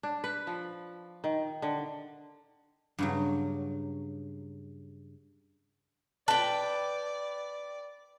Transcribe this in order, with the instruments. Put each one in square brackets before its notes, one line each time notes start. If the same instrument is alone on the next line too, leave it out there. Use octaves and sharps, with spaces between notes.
[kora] D4
B4
F3
D#3
D3
[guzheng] G2 C#3 F#3
[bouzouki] B4 G5 [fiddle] D5 [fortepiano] A5